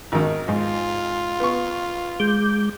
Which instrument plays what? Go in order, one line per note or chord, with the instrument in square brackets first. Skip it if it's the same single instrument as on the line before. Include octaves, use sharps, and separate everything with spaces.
[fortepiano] G#1 D#3
[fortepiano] G#2 [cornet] F4
[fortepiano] B3 C#6
[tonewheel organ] G#3 D6 G6